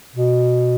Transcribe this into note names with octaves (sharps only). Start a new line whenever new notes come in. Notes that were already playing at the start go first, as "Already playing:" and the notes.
B2